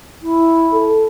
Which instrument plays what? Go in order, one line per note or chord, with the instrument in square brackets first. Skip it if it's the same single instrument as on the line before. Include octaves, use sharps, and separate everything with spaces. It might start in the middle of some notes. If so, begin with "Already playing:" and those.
[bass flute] E4
[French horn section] A4